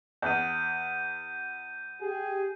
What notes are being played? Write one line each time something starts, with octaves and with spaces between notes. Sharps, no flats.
E2 G6 D#7
G4 G#4